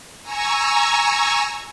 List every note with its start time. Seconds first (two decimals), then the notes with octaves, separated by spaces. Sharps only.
0.22 G#5 A#5 C#6 E6